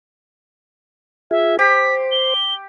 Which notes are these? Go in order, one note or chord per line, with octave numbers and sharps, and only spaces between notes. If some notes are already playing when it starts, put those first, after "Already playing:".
F4 G#4 E5
G4 C5 B6
G7